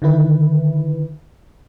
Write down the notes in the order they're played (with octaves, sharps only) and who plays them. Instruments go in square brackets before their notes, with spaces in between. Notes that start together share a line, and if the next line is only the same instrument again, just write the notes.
[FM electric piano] D3 D#3 E4 B4